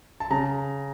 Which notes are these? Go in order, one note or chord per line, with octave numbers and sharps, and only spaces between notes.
A5
C#3 A#5